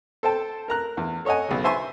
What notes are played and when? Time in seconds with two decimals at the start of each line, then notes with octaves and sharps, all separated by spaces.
0.23 A4 C5 G5 A5
0.68 A#4 A#5 F#6
0.97 E2
1.25 A4 C#5 D#5 F#5 G#5
1.49 B1 C#3
1.64 C5 E5 G#5 C6 C#6